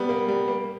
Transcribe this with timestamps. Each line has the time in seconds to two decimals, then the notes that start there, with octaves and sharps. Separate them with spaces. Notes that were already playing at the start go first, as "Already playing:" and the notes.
Already playing: G3 B3
0.09 A#3
0.28 G3
0.48 A#3